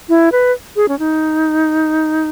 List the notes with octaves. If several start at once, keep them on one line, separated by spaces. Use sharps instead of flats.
E4
B4
G#4
C#4
D#4